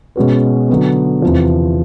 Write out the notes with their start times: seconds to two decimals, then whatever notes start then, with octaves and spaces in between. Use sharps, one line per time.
0.16 B2 G#3 C#4 F#4 B4
0.69 D3 F#3 B3
1.22 E2 C3 F3